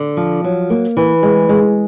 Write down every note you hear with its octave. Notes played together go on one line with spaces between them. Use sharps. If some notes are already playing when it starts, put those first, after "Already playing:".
Already playing: D3
F3
F#3
A#3
E3
G#3
G#3